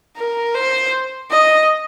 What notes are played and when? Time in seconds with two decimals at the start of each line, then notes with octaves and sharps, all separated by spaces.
0.16 A#4
0.54 C5
1.30 D#5